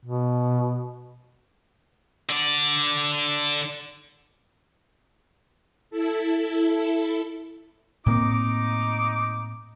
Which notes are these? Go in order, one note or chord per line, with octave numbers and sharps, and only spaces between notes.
B2
D3 D5
E4 A4
A2 A#3 C4 D#4 D6